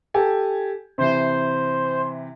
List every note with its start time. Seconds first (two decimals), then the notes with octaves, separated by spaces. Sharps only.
0.14 G4 A4 G#5
0.98 C3 E3 C5